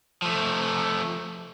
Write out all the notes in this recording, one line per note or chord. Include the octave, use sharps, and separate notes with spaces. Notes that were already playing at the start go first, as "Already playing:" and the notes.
F3 A3